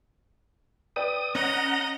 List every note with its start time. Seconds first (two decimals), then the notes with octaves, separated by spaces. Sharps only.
0.96 B4 D5 G5 D#6
1.35 C#4 D#5 F#5 A#5